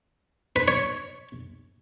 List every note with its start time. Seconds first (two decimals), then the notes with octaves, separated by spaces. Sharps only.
0.56 B4
0.68 C#5